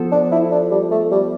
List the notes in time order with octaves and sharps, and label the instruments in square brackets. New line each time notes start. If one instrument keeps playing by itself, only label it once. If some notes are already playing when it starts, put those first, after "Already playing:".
Already playing: [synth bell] F3 B3 F4 A4 C5
[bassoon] D4
E4
D4
G3
A3
G3